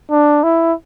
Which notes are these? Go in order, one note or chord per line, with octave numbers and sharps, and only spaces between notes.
D4
E4